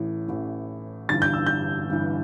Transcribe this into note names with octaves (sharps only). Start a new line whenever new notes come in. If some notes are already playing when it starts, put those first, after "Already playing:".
Already playing: A1 A2 E3
A1 A2 E3
G1 G2 E3 A6
G6
E6
G6
G1 G2 E3